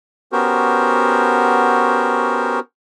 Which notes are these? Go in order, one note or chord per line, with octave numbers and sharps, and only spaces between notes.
B3 C#4 F#4 G4 A#4 C5